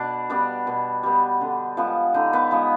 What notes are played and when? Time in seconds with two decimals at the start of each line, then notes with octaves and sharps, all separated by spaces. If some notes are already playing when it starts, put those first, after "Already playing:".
Already playing: B2 D4
0.30 G3 B3 D4
0.67 B2
1.03 G3 B3
1.41 D3
1.77 F3 G#3 B3
2.14 D3 D#4
2.33 B3
2.51 F3 G#3 B3